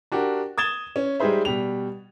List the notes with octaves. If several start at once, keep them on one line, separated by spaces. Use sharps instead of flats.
D4 F#4 G4 A#4
D#6 G#6 A6 E7 G7
C#4
G3 G#3 D#4 G#4 C5 E5
B2 G3 F7